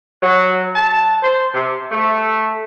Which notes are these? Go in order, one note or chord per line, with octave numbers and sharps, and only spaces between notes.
F#3
A5
C5
C3
A3